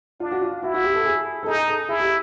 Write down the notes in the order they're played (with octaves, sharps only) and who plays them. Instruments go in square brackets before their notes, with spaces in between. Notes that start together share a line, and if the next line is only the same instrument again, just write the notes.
[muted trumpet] D4 [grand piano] F4
[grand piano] F#4
F4
[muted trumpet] E4 [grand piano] F#4
[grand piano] F#4
G4
A4
G#4
A4
[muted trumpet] D#4 [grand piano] G#4
[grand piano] A4
[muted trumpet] E4 [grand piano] G#4
[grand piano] G4